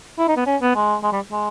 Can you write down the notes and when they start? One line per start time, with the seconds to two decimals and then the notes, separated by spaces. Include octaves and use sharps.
0.18 E4
0.28 D#4
0.37 B3
0.47 C#4
0.61 B3
0.75 G#3
1.03 G#3
1.13 G3
1.32 G#3